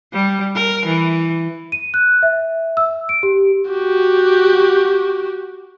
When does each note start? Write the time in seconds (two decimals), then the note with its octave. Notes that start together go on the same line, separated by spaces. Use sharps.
0.13 G3
0.55 A#4
0.86 E3
1.72 D#7
1.94 F#6
2.23 E5
2.77 E6
3.09 D7
3.23 G4
3.71 F#4 G4